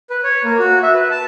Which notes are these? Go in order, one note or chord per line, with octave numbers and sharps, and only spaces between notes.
B4
C#5
A#3
F#4
E5
B4
A5